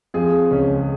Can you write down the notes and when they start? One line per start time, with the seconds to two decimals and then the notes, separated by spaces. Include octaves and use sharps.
0.14 F2 F3 G#4
0.51 C#2 C#3 C#4